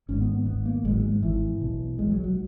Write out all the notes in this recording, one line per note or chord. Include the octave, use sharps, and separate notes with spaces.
G#1 G#2 C#4
B3
G#1 G#2 B3
A#3
G#1 G#2 F#3 G#3
G#3
G#1 G#2 E3
B1 B2
B1 B2 G#3
F#3
F#3